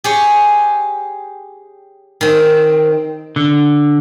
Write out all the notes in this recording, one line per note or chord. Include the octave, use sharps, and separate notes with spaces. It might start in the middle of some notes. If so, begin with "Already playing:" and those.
G4 G#4 C#5
D#3 C4
D3